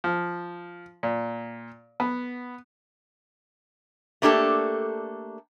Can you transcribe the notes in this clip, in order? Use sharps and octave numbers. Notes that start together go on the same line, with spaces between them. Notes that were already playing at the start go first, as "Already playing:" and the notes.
F3
A#2
B3
A3 A#3 D4 G4 A4